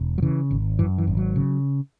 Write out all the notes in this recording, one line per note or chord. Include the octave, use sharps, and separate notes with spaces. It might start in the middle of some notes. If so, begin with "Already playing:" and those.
Already playing: E1
F#3
C#3 E3
G#1
F#2 E3
E3
G#1
F#3
C#3